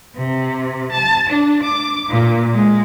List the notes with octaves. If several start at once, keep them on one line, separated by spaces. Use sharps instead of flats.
C3
A5
D4
D6
A#2
G#3